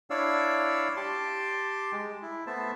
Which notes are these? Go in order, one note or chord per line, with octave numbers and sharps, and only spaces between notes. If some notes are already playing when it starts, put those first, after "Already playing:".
D4 E4 C#5 D5 F5 E6
G4 A5 C6 D6
G#3
E4
A3 B3 C5 E5 A5